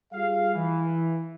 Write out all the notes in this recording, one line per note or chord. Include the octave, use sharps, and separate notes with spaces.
G3 F4 G#4 F5
E3